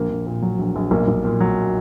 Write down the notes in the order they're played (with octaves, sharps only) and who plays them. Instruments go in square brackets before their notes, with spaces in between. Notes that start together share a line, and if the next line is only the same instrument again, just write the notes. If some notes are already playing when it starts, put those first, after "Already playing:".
Already playing: [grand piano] A#1 A#3
A#1
A#2
F#3
A#1
A#1
B1 A#3
B1
A#2
F#3